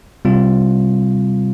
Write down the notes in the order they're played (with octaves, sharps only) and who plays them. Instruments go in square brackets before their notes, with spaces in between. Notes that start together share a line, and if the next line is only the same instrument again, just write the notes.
[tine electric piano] C3 G3 C4 F4